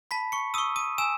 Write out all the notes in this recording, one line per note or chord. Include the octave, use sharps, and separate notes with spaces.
A5 B5 B6
C#6 C#7
C#6 D#6 E6 D#7
D#6 D#7
G#5 E6 E7